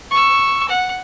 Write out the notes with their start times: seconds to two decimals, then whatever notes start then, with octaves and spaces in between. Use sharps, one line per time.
0.11 C#6 E6
0.68 F#5